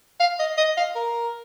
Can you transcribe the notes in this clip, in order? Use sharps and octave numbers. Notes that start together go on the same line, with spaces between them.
F5
D#5
D#5
F5
A#4